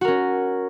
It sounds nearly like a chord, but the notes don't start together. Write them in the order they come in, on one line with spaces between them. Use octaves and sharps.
F#4 A#4 C#4